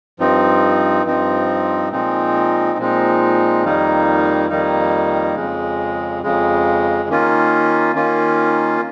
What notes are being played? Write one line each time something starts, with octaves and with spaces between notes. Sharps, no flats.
G2 F3 C4 D#4
G2 F3 C4 D#4
A#2 F3 G#3 C4 D#4
A#2 F3 G#3 C4 D#4
F2 D#3 G3 A#3 D#4
F2 D#3 G3 A#3 D#4
F2 C#3 G#3
F2 C#3 G#3
D#3 A#3 C#4 F4
D#3 A#3 C#4 F4